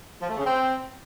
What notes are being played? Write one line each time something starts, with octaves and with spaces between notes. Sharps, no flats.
F3
A3
C#3
C4